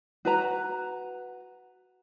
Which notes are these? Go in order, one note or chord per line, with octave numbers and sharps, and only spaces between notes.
F#4 B4 A#5